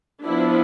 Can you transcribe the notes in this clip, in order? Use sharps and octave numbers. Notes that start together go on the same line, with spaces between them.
F3 B3 D4 E4